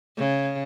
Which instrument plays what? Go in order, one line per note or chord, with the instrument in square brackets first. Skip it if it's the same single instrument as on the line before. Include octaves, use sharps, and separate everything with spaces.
[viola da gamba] C#3